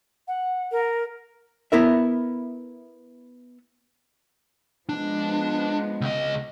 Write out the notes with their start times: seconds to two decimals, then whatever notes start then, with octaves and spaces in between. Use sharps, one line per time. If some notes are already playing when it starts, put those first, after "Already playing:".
0.28 F#5
0.72 A#4
1.72 B3 E4 A#4 E5
4.89 F3 G#3 B3 D4
6.01 C#2 D#5